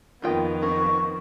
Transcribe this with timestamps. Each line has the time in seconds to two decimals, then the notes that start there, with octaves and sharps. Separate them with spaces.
0.22 F2 D#3 A#3 B3 F4 G5
0.62 C4 A#4 C#6